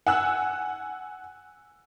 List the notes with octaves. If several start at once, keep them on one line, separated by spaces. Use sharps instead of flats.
F#5 G#5 E6 F#6